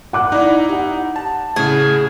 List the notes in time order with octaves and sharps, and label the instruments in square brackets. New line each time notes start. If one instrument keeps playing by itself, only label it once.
[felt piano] F#5 D6 F#6
[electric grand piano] D#4 E4 [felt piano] D5
[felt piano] G4 F#5
[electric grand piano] A5
[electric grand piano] A2 C#3 [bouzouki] G#4